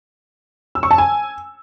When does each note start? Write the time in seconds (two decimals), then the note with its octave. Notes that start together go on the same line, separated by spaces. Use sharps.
0.75 E6
0.83 C#6
0.91 A5
0.98 G#5